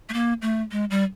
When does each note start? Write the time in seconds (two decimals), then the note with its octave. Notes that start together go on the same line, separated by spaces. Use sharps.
0.09 A3
0.14 A#3
0.42 A3
0.72 G#3
0.90 G3